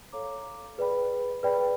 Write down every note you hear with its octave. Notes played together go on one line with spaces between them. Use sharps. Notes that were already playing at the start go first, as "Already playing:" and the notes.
A4 C#5 F5 A#5 D6
G#4 B4 D5 G5 B5
G#4 B4 D5 G5 B5